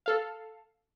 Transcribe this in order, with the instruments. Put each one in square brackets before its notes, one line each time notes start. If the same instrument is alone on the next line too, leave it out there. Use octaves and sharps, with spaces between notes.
[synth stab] A4 F5